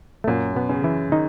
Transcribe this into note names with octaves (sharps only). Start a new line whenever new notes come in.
A3
F#2 A#2 A#3
B2 B3
C#3
E3 E4
D#3 D#4